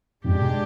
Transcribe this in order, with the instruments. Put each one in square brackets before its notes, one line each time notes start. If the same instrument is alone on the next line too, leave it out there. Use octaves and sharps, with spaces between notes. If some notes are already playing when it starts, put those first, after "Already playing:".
[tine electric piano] F2 G#2 [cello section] G#3 D4 G4
[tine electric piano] B2